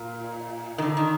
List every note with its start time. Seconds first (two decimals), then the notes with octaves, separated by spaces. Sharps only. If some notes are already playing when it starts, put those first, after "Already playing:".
Already playing: A#2
0.78 D#3
0.82 D3
0.97 D#3